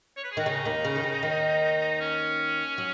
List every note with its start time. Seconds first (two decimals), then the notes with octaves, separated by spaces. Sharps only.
0.17 C#5
0.24 B4
0.32 G#4
0.37 D#3 F#4
0.46 C#3 D#4
0.65 D#2 D#3
0.85 C#3
0.96 D#3
1.03 C#3
1.23 D#2 D#3
2.00 C#4
2.78 F#3